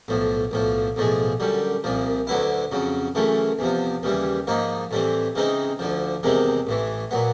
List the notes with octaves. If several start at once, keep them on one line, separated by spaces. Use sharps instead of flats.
B1 A2 F3
B1 A2 F3
B1 A2 F3 G#3
F#2 D3 G3
C2 A#2 F3
D2 D3 F#3 B3 E4
F2 C#3 F#3
F#2 C#3 E3 A3
E2 C3 F3
D#2 C#3 E3 G3
G#2 F3 A#3 D#4
A2 E3 G3 C4
C#3 E3 G#3 C4 D#4
D2 D3 F3
E2 C3 D#3 G#3 C4
A1 A2 E3
A#2 F#3 B3